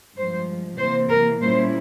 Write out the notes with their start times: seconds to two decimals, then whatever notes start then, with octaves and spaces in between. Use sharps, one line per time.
0.17 G2 F3 G#3 C5
0.79 C3 E3 A#3 C5
1.10 A#4
1.41 A#2 G3 A#3 C#4 E4 C5